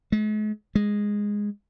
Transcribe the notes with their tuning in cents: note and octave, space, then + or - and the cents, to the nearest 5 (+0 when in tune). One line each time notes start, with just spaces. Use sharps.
G#3 +45
G#3 -10